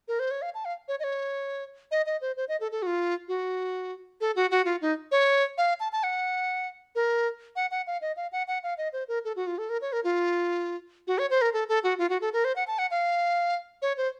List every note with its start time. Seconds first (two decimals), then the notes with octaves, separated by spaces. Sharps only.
0.08 A#4
0.20 C5
0.31 C#5
0.42 F5
0.54 A5
0.65 F5
0.88 C#5
1.00 D#5
1.04 C#5
1.91 D#5
2.06 D#5
2.21 C5
2.37 C5
2.48 D#5
2.61 A4
2.72 A4
2.82 F#4
2.87 F4
3.28 F#4
4.21 A4
4.36 F#4
4.51 F#4
4.65 F4
4.81 D#4
5.12 C#5
5.58 F5
5.80 A5
5.92 A5
6.03 F#5
6.95 A#4
7.56 F#5
7.71 F#5
7.87 F5
8.01 D#5
8.17 F5
8.32 F#5
8.48 F#5
8.63 F5
8.78 D#5
8.93 C5
9.08 A#4
9.25 A4
9.36 F#4
9.47 F4
9.58 A4
9.69 A#4
9.82 C#5
9.93 A#4
10.04 F4
11.07 F#4
11.19 C#5
11.30 C5
11.42 A#4
11.53 A4
11.69 A4
11.84 F#4
11.99 F4
12.10 F#4
12.21 A4
12.33 A#4
12.45 C5
12.56 F#5
12.67 A5
12.79 F#5
12.91 F5
13.82 C#5
13.97 C5